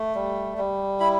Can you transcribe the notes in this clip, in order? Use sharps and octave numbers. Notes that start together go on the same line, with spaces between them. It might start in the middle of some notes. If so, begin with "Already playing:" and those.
Already playing: A3
G3
G3
E4 B5